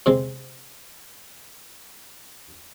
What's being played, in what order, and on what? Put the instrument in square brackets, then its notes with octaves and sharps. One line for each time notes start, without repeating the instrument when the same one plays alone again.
[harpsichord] C3 G#3 C4